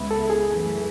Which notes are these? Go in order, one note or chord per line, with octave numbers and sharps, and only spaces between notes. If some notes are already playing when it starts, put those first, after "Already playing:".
Already playing: C#2 C#3 G#3 B3 E4
A4
G#4
F#2 E3 A3